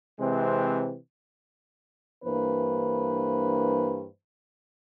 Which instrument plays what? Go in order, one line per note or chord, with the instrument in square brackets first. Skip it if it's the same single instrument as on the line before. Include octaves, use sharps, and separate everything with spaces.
[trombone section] C3 E3 G#3 C4
[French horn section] G2 E3 A#3 D4 B4 C5